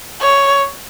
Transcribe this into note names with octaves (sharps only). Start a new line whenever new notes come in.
C#5